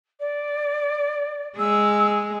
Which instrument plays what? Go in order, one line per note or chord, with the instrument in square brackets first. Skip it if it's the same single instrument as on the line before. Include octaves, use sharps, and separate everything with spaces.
[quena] D5
[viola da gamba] G#3 G#4 [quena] E6